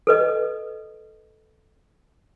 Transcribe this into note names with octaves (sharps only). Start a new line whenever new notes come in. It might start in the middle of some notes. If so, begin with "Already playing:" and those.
A4 B4 D#5